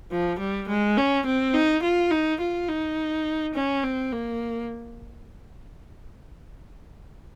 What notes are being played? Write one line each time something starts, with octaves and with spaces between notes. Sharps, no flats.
F3
G3
G#3
C#4
C4
D#4
F4
D#4
F4
D#4
C#4
C4
A#3